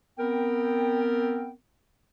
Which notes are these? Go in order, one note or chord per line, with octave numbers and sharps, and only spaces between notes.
B3 C4 A#4 G5